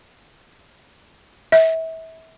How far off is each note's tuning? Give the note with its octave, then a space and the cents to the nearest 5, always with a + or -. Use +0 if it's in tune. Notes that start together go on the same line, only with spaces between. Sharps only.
E5 -30